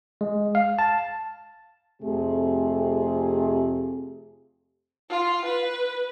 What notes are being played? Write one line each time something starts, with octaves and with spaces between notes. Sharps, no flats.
G#3
F5
A5
F2 C3 A3 C4 G4 G#4
F4
B4